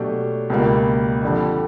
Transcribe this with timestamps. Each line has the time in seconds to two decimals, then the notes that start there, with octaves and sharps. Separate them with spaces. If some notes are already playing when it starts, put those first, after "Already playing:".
Already playing: B2 F#3 A3 D4 G4
0.50 C#2 B2 G3 A#3
1.22 F2 D3 G3